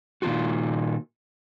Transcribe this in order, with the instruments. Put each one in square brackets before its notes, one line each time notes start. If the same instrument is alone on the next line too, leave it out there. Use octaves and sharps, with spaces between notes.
[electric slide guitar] A#2 D#3 F#3 F4 F#4